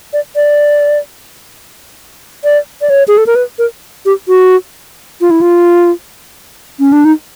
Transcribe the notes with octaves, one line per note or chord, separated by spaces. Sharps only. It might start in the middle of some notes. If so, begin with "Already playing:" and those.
D5
D5
D5
D5
C#5
G#4
A4
A#4
B4
A#4
G4
F#4
F4
E4
F4
C#4
D4
D#4